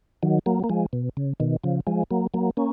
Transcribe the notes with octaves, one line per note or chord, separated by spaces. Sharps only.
D#3 F#3
F#3 A#3
A#3
F3 G#3
B2
C#3
B2 D#3
C#3 F3
F3 G#3
F#3 A#3
F#3 A#3
A#3 C#4